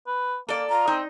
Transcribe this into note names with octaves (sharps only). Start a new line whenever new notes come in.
B4
A#3 A4 D5
F4 A#5
C4 D#4